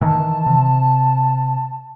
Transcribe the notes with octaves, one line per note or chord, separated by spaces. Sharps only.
D#3 E3 A5
C3